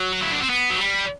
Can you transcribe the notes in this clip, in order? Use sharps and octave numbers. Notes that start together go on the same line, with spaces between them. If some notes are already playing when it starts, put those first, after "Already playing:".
Already playing: F#3
F#4
E4
D4
C4
B3
F#3
G3